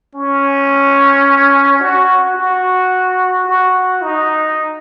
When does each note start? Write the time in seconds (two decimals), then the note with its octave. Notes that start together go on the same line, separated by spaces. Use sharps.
0.15 C#4
1.80 F#4
2.37 F#4
3.46 F#4
4.02 D#4